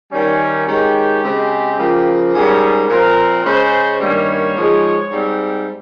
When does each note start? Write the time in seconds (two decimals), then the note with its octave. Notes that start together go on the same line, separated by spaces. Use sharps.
0.12 D#3 G3 C#4
0.66 D#3 G#3 C#4 G4
1.23 C#3 G#3 C4
1.78 C#3 F3 A#3
2.33 G#2 G3 A#3 C#4 G#4
2.89 A#2 F3 C4 A#4
3.44 C#3 G#3 C#4 C5
4.00 G2 D#3 G3 A#3 C#4 C#5
4.55 G#2 F3 G#3
5.11 G#2 G3 C4